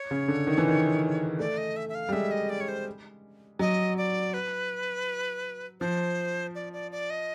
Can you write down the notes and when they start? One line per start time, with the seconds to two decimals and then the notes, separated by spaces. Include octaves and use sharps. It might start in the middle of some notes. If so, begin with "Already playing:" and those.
Already playing: C#5
0.11 C#3
0.28 D3
0.47 D#3
0.58 E3
0.68 D#3
1.39 A3 D5
1.57 D#5
1.76 E5
1.89 E5
1.95 F5
2.09 G3
2.13 G#3 E5
2.31 D#5
2.50 D5
2.60 C#5
2.68 C5
3.59 F#3 D#5
3.97 D5
4.34 B4
5.81 F3 C5
6.55 D5
6.73 D5
6.92 D5
7.10 D#5